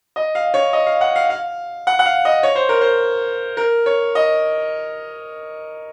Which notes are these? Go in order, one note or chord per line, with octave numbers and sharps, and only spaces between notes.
D#5
F5
C#5
D#5
F5
F#5
F5
F5
F#5
F#5
F5
D#5
C#5
C5
A#4
C5
A#4
C#5
D#5